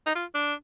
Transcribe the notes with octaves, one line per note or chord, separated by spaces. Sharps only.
D#4
F4
D4